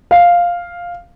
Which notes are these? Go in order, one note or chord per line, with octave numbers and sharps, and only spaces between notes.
F5